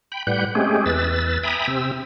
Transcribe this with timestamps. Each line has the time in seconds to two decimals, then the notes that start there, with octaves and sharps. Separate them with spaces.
0.12 G5 B5
0.27 A2 G3 B4 F#5 G6
0.55 G#3 A3 C4 C#4 G4 G#4
0.86 E2 B4 E6 A6
1.43 E5 G5 G#5 A#5 B5 D#6
1.67 C3 C4 E6